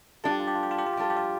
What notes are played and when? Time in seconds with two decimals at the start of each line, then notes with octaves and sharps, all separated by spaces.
0.24 G3 D4 F4 A4
0.31 G4
0.40 F4
0.47 G4
0.55 F4
0.63 G4
0.71 F4
0.78 G4
0.86 F4
0.93 G4
0.97 G3 D4 F4 A4
1.10 G4
1.17 F4